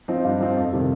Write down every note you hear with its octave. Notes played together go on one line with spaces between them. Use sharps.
F3 C4 D#4
G2
F3 C4 D#4
F2
C3 D#3 G3